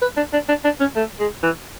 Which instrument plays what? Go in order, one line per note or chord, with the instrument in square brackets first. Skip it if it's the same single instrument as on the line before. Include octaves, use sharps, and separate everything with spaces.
[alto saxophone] B4
D4
D4
D4
D4
C#4
A3
G#3
E3